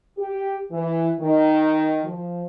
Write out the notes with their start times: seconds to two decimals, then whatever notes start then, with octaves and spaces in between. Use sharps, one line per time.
0.17 G4
0.71 E3
1.19 D#3
2.04 F3